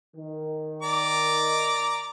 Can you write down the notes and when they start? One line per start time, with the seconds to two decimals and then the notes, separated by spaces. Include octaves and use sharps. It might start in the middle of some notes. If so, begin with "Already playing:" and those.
0.16 D#3
0.83 D5 A#5 D6